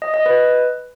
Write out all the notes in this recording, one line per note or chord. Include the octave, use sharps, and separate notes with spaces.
D#5
D#5
B4